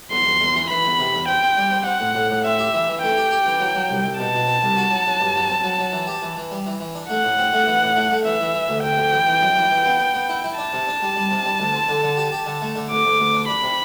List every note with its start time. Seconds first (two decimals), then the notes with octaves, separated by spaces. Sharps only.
0.11 E2 C6
0.26 E2
0.41 E2
0.56 E3
0.70 E3 B5
0.85 E2
0.99 C3
1.14 E2
1.28 C4 G5
1.42 C4
1.57 G3
1.71 C4
1.86 C4 F#5
2.00 A2
2.15 A2
2.30 A2
2.44 C4 E5
2.59 G4
2.74 E3
2.88 E3
3.02 A3 G5
3.17 G4
3.31 G4
3.46 E3
3.60 F#3
3.75 F#3
3.89 C2
4.04 C2
4.19 B2 A5
4.34 B2
4.47 C4
4.62 C2
4.77 F#4
4.91 F#3
5.06 F#3
5.20 G2
5.35 F#3
5.50 C4
5.63 F#3
5.79 F#3
5.93 E3
6.07 G4
6.22 E3
6.36 E3
6.51 G3
6.66 E3
6.80 E3
6.95 D4
7.09 A3 F#5
7.24 A2
7.38 C4
7.53 A3
7.67 E3
7.82 A2
7.96 A3
8.11 A3
8.25 E3 E5
8.41 E3
8.54 E3
8.69 D2
8.83 D2 G5
8.98 D2
9.13 E3
9.27 E3
9.41 F#2
9.57 E3
9.71 E3
9.85 B3
10.00 B3
10.15 B3
10.29 E4
10.44 E4
10.58 D4 A5
10.73 C3
10.88 D4
11.02 G3
11.16 G3
11.31 C3
11.45 G3
11.60 D2
11.74 C4
11.89 D3
12.03 D3
12.17 G4
12.32 G4
12.46 D3
12.62 A3
12.76 D3
12.91 D2 D6
13.05 D2
13.19 D2
13.34 D4
13.48 D4 B5
13.63 C3